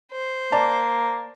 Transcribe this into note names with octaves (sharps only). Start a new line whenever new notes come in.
C5
A#3 D5 A5